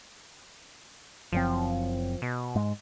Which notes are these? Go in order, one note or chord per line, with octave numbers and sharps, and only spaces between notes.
F#1 F#2 F3 C4
B2
G#2 G#3